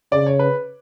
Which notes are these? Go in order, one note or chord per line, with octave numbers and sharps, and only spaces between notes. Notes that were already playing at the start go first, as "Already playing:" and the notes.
C#3 D5
C#5
B4